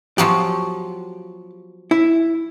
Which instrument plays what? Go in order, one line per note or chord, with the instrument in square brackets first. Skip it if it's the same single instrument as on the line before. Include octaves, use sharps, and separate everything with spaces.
[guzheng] F3 F#3 B3 [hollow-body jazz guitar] G4
[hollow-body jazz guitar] E4